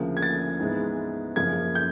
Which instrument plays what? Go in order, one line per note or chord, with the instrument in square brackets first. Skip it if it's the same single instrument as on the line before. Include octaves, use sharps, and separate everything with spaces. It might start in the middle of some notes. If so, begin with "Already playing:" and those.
Already playing: [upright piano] D2 C#3 F3 A#3
G#6
A6
G#2 E3 G#3 B3
F#2 C#3 F3 A#3 G#6
G6